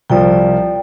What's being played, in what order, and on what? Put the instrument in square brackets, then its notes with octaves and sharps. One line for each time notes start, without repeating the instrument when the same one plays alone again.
[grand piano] C2 F3 [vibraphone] D5 G5